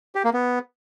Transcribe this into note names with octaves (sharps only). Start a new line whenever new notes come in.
G4
A#3
B3